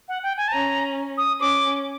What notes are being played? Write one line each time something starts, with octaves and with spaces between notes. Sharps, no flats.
F#5
G5
G#5
A5
C#4 A#5
D#6
C#4 D6